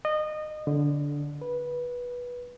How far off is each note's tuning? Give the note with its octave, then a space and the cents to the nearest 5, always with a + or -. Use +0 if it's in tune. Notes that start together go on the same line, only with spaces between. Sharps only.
D#5 -25
D3 -15
B4 -15